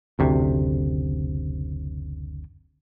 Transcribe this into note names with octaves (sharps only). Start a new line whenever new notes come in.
F#1 D2 C3